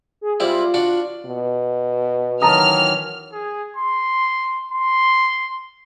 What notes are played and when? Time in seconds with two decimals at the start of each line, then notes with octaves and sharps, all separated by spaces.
0.21 G#4
0.40 G3 C4 E4 F4
0.74 D4 F#4
1.26 B2
2.42 D#3 E3 F#3 A5 A#5 D#6 F6
3.32 G#4
3.76 C6
4.71 C6